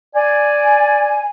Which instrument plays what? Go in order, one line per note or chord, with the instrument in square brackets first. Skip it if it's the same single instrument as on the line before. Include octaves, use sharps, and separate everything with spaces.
[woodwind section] D5 G#5